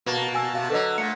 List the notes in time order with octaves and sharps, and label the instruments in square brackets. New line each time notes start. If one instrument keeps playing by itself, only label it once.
[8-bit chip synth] B2 F#4 A5 [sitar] A#3 [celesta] B4
[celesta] G#5 E6
[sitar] C3 [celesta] F5
[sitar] D3 F#3 [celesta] A4 B4 D#5
[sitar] A#2 [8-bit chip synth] A3 [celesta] C#7